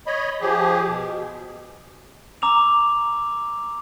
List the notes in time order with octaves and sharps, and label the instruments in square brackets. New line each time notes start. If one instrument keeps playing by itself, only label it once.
[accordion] C#5 D#5 B5
F3 G4 G#4
B2
[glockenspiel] A#5 D6 E6 F7